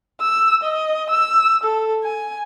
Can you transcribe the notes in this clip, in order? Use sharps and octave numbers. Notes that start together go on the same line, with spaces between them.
E6
D#5
E6
A4
G#5